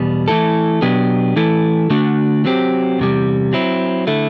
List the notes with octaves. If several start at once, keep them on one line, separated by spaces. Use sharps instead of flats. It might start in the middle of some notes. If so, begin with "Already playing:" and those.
Already playing: E2 B2 G3
E3 A3 E4 A4
B2 F#3 B3 D4 G4
E3 A3 E4 A4
D3 A3 D4 F#4
F#3 C4 G4
E2 C3 G3
F#3 C4 E4
D3 A3 E4